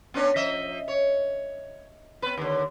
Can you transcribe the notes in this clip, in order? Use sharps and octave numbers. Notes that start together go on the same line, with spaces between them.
B3 C#4 D4
F3 D#5 E5
C#5
B3 B4
D#2 D3